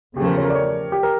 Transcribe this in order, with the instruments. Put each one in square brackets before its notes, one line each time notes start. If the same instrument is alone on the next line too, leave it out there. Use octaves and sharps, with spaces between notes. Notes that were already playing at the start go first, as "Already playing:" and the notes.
[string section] E2 C#3 F3 A3 [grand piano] G4
[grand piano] A#4
C#5
A#4
D5
C#5
G4
A#4